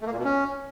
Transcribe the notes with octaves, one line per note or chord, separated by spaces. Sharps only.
A3
A#3
A#2
B2
C#4